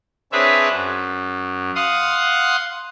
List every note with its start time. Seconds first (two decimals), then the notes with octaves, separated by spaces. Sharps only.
0.32 C4 D4 G#4 B4 C#5 E5
0.71 F#2
1.75 F5 F#5 C6 D#6